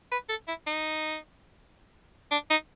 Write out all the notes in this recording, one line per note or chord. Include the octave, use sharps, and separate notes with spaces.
B4
A4
E4
D#4
D4
D#4